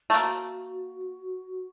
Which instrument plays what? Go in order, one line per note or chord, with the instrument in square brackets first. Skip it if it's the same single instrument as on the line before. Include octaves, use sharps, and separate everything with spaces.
[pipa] A3
[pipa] A#3 [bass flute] F#4